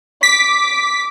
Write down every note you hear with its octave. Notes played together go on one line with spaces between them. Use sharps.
D6 B6